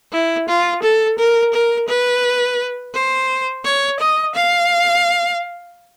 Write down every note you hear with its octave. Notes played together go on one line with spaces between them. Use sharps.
E4
F4
A4
A#4
A#4
B4
C5
C#5
D#5
F5